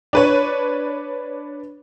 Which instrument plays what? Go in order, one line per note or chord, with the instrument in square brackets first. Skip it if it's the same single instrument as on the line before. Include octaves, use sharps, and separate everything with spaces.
[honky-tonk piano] D4 B4 C#5